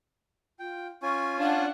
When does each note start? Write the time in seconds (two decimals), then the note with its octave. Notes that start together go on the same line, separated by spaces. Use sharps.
0.59 F4 G5
1.03 C#4 F4 G#5 C#6
1.39 D4 F5 F#5